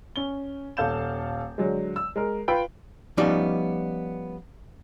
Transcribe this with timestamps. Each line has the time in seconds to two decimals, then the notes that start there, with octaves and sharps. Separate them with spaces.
0.16 C#4 G7
0.77 D#1 A4 F5 G6 E7
1.58 D3 F#3 G#3
1.96 E6
2.16 G#3 A#4
2.48 F4 B4 G5 B5 D7
3.17 F3 G3 B3 C#4 D#4 D5